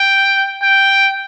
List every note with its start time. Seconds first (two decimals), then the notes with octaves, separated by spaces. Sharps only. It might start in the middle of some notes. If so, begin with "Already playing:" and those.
Already playing: G5
0.62 G5